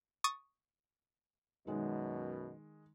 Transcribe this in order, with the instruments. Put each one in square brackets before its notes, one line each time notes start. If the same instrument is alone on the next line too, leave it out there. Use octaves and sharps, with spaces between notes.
[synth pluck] C#6 D#6 A6
[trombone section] F#2 B2 [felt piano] D#3 G#3